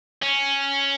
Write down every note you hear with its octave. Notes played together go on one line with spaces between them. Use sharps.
C#4